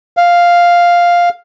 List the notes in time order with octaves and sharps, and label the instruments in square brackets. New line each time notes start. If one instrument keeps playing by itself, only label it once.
[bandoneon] F5